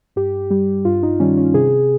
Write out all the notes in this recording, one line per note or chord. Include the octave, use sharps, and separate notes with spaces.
G2 G4
G3 G4
G2 F4
D#4
D#3 G3 C#4
C#4
C3 G#4